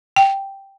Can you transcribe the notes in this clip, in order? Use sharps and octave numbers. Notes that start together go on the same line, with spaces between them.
G5